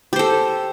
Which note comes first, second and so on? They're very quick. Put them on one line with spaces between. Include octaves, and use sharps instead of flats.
G4 C5 A4